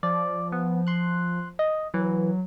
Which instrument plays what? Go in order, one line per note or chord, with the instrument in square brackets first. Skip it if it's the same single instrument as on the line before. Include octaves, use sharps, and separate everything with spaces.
[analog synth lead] F3 [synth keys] D5
[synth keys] B3
C6 F#6
D#5
[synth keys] E3 [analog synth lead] F#3